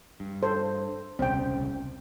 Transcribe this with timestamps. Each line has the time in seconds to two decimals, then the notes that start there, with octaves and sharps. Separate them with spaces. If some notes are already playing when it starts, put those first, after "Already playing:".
0.20 G2
0.43 A4 C5
1.19 D#1 C2 C#3 C4 G5